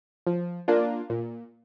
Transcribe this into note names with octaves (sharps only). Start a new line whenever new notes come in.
F3
A#3 D4 F4
A#2